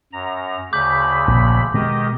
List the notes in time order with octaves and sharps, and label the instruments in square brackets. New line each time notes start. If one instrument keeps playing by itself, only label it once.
[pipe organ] F#2 A#5
[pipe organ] D2 C#3 B5 [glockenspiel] D6 G6
[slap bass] A#1
[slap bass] B2 G#3 [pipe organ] D#3 G4 D#5